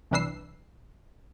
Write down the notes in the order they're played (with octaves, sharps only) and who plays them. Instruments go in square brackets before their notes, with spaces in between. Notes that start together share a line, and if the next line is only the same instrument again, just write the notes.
[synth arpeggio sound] C2 E3 D4 B4 E6 C7